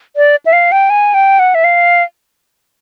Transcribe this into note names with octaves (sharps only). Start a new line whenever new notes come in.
D5
E5
F5
G5
G#5
G5
F#5
E5
F5